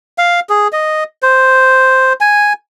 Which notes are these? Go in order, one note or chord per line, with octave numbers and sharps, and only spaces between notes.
F5
G#4
D#5
C5
G#5